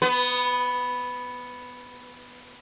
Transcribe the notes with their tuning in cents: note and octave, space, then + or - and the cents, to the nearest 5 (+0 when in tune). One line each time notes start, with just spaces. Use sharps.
B3 +0 B4 +25